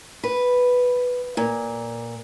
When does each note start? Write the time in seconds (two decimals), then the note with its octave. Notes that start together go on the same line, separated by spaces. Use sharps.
0.23 B4
1.37 A#2